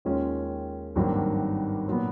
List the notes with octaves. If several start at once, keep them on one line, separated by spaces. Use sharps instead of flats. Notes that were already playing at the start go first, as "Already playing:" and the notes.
D#2 D#3 G#3 C#4 F4
G#1 G2 D#3 F#3 A#3
A#2 F#3 B3